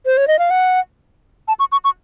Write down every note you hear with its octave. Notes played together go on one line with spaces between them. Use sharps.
C5
C#5
D#5
F5
F#5
A5
C#6
C#6
C#6